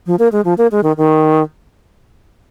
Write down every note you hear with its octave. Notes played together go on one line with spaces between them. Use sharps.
F3
A#3
G#3
F3
A#3
G#3
D#3
D#3